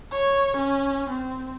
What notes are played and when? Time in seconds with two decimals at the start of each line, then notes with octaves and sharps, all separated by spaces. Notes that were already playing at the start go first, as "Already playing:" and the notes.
0.12 C#5
0.57 C#4
1.09 C4